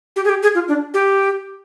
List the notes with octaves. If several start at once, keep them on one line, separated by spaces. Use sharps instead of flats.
G4
G#4
G4
G#4
F4
D4
G4